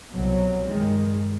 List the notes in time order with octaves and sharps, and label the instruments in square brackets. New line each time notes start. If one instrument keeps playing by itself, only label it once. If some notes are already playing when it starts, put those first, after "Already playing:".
[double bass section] C2 B2 F#3
G2 D#3 G#3